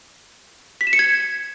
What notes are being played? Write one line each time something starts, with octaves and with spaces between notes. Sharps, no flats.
B6
E7
C#7
G#6